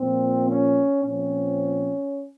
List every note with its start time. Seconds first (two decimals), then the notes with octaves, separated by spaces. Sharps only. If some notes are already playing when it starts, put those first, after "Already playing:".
Already playing: A#2 F3 A#3 C4
0.47 C#4
1.02 A#2 F3 C4 C#4